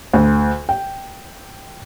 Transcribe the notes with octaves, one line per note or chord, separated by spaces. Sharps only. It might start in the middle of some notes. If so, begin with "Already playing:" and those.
D2
G5